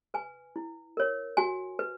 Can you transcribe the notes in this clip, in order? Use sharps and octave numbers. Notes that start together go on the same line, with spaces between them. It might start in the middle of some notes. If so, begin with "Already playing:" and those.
B4 G#5
E4
A#4 C#5
F#4 G#5
B4